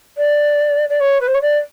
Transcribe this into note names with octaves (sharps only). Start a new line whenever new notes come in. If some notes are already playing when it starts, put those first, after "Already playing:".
D5
D5
C#5
B4
C5
C#5
D5